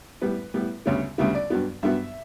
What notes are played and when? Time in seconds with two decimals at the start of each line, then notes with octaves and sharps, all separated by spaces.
0.22 A2 G3 B3 B4
0.54 A2 G3 B3
0.86 D2 C#3 G3 B3 C#5
1.18 D2 C#3 G3 B3 E5
1.35 D5
1.50 G2 F#3 B3
1.83 G2 F#3 B3 E5